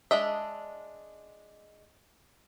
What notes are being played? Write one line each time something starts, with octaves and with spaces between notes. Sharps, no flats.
G#3 D4 D#5 E5